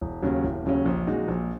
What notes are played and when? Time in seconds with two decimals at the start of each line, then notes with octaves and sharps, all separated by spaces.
0.01 E1
0.22 D#2 C#3 F#3 C#4
0.44 E1
0.65 D#2 C#3 F#3 C#4
0.85 A#1
1.07 A#2 G#3 D#4 F#4
1.28 A#1